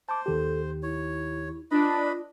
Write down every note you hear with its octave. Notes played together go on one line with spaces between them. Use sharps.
C5 A5 D6
D#2 D#3 G4 A4
E4 C#5
D4 F4 B4 D#5 B5